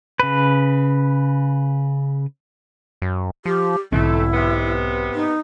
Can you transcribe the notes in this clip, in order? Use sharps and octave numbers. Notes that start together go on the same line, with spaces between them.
C#3 B4
F#2
F3 G4
B1 G#2 D3 A3 C4 E4
C3 B3
D#4